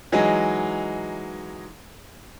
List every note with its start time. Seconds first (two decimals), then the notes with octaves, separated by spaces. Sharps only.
0.12 E3 F#3 G#3 D#4 G#4